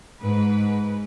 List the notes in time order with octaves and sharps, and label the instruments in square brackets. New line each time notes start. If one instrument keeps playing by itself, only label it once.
[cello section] G#2 B4